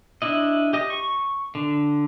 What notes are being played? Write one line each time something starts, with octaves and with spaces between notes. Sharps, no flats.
D4 E4 D#5
G4 D#5
C#6
D3